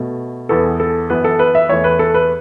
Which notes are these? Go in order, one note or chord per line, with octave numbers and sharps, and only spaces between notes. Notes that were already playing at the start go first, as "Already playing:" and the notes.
Already playing: B2 A3
E2 E3 B3 A4
A4
F#2 E3 B3 B4
A4
B4
E5
E2 E3 A3 C#5
B4
A4
B4